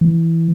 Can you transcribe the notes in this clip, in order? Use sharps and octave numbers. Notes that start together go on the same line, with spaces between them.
E3